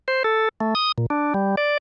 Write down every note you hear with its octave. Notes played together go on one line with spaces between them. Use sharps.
C5
A4
A3
D#6
A#2
D4
G3
D5